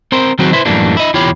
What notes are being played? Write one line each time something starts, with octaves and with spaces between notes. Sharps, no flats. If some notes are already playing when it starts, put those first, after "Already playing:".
C4 A#4 C5
D#3 F#3 C4 F#4 G#4
E4 B4 C5
F#2 A2 E3 G3 A#3 D4
E4 D#5
E2 E4 F4 G4 C#5 B5